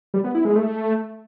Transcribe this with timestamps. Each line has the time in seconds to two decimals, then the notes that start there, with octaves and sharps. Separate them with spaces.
0.14 G3
0.24 B3
0.35 E4
0.45 G#3
0.55 A3